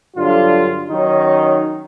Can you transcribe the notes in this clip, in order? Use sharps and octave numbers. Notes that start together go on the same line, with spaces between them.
G2 D3 F#3 F4
D#3 F#3 C#4 D#4